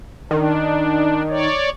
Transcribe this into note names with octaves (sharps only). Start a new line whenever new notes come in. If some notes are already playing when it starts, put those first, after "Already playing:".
D#3 D4
C#5 D5